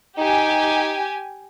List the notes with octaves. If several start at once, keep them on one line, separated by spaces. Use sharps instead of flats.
D#4 G4 G#5